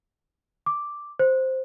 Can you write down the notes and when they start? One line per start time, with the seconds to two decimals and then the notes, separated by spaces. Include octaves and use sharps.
0.66 D6
1.19 C5